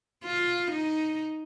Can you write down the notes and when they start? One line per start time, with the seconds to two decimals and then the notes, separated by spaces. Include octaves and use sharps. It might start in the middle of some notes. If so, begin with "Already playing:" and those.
0.25 F4
0.71 D#4